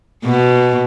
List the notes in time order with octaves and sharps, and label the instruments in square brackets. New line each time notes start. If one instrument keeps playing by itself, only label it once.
[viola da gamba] B2